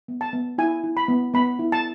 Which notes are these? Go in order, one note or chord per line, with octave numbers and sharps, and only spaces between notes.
B3
A5
B3
E4 G#5
E4
B5
B3
B3 B5
E4
A5